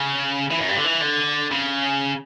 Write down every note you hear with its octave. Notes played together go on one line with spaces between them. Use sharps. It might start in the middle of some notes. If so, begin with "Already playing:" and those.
Already playing: C#3
E3
F#2
G2
D3
E3
D3
C#3